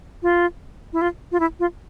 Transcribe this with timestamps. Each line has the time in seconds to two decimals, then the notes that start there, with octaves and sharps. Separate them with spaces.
0.23 F4
0.93 E4
1.01 F4
1.32 F4
1.40 E4
1.60 F4